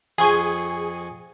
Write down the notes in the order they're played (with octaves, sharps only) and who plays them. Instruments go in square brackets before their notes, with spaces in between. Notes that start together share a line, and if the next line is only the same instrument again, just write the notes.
[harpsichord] F2 C6 C#6 [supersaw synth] G#4 G#5